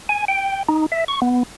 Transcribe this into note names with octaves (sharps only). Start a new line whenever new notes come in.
G#5
G5
D#4
E5
C#6
B3